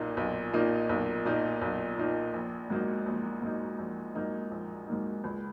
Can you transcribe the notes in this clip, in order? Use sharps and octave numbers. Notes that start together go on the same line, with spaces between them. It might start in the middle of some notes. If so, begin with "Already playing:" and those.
Already playing: B1 A#2 A#3 D#4
B1
A#2 A#3 D#4
B1
A#2 A#3 D#4
B1
A#2 A#3 D#4
A#1
G#2 F#3 A#3 D#4
A#1
G#2 F#3 A#3 D#4
A#1
G#2 F#3 A#3 D#4
A#1
G#2 F#3 A#3 D#4
C#2